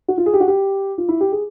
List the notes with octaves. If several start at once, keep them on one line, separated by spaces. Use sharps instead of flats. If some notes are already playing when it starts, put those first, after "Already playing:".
F#4
F4
G#4
G4
F#4
G4
F4
E4
G4
G#4